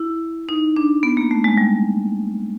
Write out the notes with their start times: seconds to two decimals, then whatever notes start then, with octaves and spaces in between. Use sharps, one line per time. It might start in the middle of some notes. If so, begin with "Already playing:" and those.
Already playing: E4
0.49 D#4
0.76 D4
1.03 B3
1.17 A#3
1.31 A3
1.44 G#3
1.58 G3